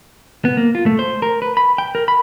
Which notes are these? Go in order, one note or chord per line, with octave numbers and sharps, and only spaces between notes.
B3
A#3
F4
A3
C5
A#4
B4
B5
G5
A#4
B5